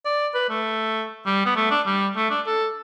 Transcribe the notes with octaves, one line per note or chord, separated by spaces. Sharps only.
D5
B4
A3
G3
B3
A3
D4
G3
A3
D4
A4